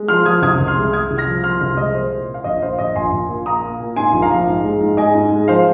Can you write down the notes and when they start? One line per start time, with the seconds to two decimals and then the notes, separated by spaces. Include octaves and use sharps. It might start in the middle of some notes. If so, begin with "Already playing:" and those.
Already playing: G#3
0.08 F3 C6 F6
0.25 F3 D#6 G#6
0.42 C2 D#6 G#6
0.60 C2
0.67 C6 F6
0.76 G#3
0.93 G#3 D#6 G#6
1.11 C2
1.18 F6 A#6
1.27 F3
1.44 F3 C6 F6
1.60 C2 C6 F6
1.77 G#3 D#5
1.95 A#2 C5
2.12 A#2
2.28 A#2
2.34 F5
2.44 A#1 D#5
2.62 A#1 C5 F5
2.79 A#1 D#5
2.96 A#1 G#5 C6
3.12 A#1
3.29 A#2
3.46 A#3 A#5 D#6
3.63 A#3
3.80 A#2
3.96 G#2 G#5 C6
4.13 A#1
4.22 F5 A#5
4.30 F3
4.47 G#2
4.64 G#3
4.80 G#2
4.97 G#3 D#5 G#5
5.15 G#2
5.31 G#3
5.48 F3 C5 F5